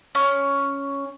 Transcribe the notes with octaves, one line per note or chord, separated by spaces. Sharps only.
C#4